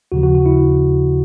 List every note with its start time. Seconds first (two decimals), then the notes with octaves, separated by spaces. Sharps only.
0.12 D#2 C#3 F3 F#4
0.23 F#4
0.35 F#4
0.46 E4